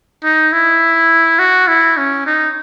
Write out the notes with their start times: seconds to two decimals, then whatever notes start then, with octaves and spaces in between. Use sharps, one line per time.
0.24 D#4
0.52 E4
1.39 F#4
1.68 E4
1.97 C#4
2.26 D#4